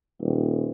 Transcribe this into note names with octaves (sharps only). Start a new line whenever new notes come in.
D#1